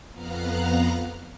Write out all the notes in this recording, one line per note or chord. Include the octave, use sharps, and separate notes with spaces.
F2 B3 F5 A#5 F6 F#6